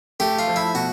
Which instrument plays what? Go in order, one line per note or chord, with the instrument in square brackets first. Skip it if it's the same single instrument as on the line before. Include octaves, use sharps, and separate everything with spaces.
[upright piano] A3 [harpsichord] G4
[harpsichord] F4
[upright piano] F3
[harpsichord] E4
[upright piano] B2 [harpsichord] F#4